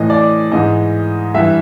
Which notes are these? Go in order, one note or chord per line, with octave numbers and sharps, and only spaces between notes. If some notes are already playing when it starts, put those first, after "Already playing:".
Already playing: A2 E3 D#5
D5
G#2 E3 D#5
G2 E3 E5